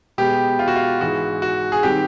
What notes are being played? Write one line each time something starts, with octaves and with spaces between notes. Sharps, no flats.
B2 G#3 B3 G4
F4
F#4
F4
G#2 E3 G#3 F#4
F#4
G#4
D#3 G3 C4 G4